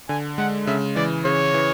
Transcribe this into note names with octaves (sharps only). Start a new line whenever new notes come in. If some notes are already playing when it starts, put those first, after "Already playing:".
D3 G#5
G#3 F#5
C#3 E5
E3 D5
C#3 C#5
E3